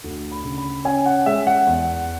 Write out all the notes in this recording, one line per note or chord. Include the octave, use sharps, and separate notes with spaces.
D2
B5
C#3
B5
C#4 G#5
F#5
G#3 E5
F#5
E2